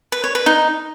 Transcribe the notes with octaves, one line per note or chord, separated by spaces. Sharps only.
B4
C#5
B4
D#4